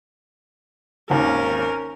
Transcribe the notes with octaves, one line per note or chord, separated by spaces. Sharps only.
G#1 D#2 C#4 A#4